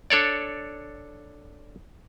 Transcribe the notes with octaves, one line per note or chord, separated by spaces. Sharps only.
D4 A4 C#5 D5